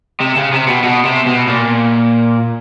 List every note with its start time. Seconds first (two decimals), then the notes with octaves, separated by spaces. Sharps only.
0.20 C3
0.37 C#3
0.53 C3
0.68 B2
0.84 B2
1.05 C3
1.26 B2
1.47 A#2